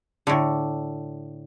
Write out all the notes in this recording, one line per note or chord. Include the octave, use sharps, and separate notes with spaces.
A2 D3